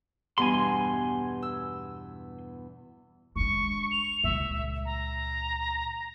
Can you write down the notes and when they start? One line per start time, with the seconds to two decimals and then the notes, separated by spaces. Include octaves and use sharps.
0.38 E2 G2 B2 G#5 C6
1.42 E6
3.36 G#3 D4 C#6
3.91 F7
4.24 C#2 A#2 E5
4.85 A#5